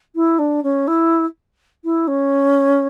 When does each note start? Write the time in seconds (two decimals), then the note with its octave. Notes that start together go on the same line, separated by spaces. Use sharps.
0.15 E4
0.38 D4
0.63 C#4
0.87 E4
1.84 E4
2.07 C#4